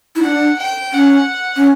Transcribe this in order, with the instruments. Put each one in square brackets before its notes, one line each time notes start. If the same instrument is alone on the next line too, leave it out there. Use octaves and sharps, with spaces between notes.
[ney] E4
[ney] D4 [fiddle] F#5
[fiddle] G5
[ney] C#4 [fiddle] F#5
[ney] C#4